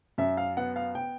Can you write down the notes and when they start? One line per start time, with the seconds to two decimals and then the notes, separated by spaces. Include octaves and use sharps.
0.18 F#2 E5
0.37 F5
0.57 B3 F#5
0.76 F5
0.95 G5